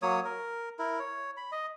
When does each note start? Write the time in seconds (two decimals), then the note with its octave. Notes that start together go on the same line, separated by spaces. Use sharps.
0.02 F#3 A#3 C#5 D#6
0.25 A#4
0.79 E4 A#4
0.99 C#5
1.37 B5
1.52 D#5